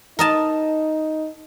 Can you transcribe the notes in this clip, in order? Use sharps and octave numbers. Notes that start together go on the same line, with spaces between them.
D#4 A#4 D#5 A5